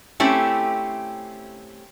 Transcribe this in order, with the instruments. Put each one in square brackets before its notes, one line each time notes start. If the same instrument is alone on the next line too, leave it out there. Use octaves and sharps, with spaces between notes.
[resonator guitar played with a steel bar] A3 C4 C#4 E4 G4